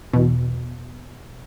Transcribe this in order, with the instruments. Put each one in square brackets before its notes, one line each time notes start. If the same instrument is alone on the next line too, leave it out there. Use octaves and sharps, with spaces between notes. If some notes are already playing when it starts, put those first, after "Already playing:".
[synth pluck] E2 B2